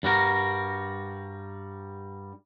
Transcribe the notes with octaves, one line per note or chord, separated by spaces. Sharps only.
G2 G3 F#4 A#4